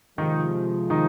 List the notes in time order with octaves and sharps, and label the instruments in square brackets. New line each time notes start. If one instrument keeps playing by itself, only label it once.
[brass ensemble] C3 F3 G#3 [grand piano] D#3 D#4
[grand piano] D#3 D#4